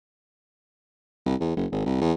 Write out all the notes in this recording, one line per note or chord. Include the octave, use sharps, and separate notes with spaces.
C2
E2
F#1
G#1
C2
E2